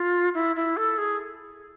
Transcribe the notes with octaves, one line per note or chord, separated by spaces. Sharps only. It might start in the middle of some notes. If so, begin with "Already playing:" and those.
Already playing: F4
E4
E4
A4
G#4